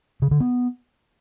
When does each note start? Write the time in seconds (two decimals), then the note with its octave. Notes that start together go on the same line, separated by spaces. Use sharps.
0.22 C#3
0.31 D3
0.40 B3